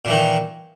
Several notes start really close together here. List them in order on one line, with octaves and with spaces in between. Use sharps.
A#2 E3 D#3